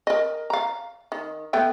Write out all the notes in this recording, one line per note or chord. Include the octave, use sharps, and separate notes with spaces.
A#4 D#5
F5 A#5
D#3
A3 B3 G5